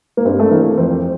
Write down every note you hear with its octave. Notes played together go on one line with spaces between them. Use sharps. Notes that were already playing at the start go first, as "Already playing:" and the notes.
A#3
G2 C4
A3
E3 A#3
F2 C4